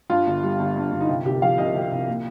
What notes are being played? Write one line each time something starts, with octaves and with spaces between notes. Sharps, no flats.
G2 F4
G1
G3
G1
G2
G1
D#4
C3 F4
C2 G4
F3 F5
C2 D#5
C3
C2
A#2